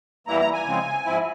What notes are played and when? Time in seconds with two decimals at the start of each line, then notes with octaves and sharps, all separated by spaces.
0.27 E2 E3 G3 A#3 E4 A#5
0.40 A#5
0.53 G#5
0.65 C#3 F3 G#3 C4
1.05 G#2 F3 C4 E4